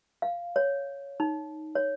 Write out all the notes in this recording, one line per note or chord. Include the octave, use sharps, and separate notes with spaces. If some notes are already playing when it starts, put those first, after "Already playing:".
F5
C#5
D#4
C#5